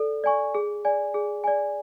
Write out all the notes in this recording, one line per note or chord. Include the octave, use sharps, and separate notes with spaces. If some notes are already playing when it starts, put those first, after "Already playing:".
Already playing: A4 D5
D5 G#5 C#6
G#4
D5 G#5
G#4
D5 G#5